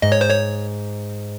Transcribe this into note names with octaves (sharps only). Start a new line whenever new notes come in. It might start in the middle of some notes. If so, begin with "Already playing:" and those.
G#2 D#5
C#5
C5
C#5